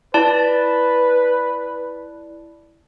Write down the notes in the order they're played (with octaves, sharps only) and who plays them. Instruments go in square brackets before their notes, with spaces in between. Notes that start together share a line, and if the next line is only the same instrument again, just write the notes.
[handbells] E4 D5 A5 [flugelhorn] B4